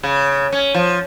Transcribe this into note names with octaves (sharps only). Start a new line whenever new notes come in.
C#3
C#4
F3